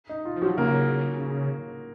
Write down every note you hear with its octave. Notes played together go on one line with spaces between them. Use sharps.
D#4
F4
F3
F#3 F#4
C#3 A#3 A#4